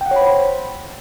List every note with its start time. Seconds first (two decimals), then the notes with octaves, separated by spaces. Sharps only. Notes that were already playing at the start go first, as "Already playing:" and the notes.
0.01 G5
0.06 F#5
0.11 C#5
0.16 B5
0.21 C5